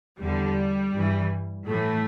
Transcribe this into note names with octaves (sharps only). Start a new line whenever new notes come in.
E2 D3 G3
G2 E3
A2 E3 A3